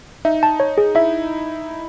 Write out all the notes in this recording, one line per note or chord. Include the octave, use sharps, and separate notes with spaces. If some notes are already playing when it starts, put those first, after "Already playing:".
D#4 E5
A5
C#5
G#4
E4 E5